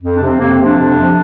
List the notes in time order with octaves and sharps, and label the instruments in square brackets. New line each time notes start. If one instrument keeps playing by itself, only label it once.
[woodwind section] F2
D4
C3 F3
C4
F2 A#3
C4
C3 F3
D4
F2
C3 F3